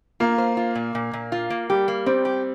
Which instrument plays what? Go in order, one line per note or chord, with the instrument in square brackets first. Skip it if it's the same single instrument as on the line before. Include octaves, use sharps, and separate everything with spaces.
[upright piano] A#3 [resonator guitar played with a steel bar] F4
[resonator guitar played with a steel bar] C5
F4
A#2
A#2
A#2
F4
A#3
[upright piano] G3 [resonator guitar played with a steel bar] G4
[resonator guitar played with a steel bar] A#3
[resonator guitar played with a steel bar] G3 [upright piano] C4
[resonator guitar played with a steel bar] G4